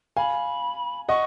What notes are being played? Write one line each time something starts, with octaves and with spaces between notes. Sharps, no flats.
F5 G#5 B5
D#5 F#5 C#6